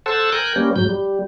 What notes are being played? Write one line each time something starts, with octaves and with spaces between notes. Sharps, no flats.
A4 C5 F#5 A5 E6
A#4 G5 G#5 F#6 G6
G3 A#3 C#4
G#2 F#3 G6
G3